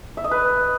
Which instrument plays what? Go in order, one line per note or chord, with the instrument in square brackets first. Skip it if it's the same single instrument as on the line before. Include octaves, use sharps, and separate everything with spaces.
[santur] E5
D#5
B4